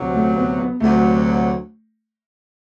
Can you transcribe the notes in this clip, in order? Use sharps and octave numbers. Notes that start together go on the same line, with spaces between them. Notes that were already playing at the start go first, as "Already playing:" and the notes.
Already playing: D2 C3 F#3
A3
B3
B3
D2 C3 F#3 A3